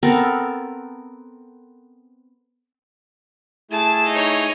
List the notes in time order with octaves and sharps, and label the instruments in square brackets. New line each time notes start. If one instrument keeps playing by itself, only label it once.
[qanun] B3 C4 A4 A#4
[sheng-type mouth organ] A3 E4 G#4 [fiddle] A5
[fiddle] D#4 C#5